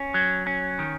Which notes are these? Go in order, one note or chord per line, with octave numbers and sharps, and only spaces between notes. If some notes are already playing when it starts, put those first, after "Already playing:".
Already playing: C#4
F#3
C#4
D#3